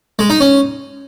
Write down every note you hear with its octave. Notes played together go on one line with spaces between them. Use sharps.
G#3
D#4
C#4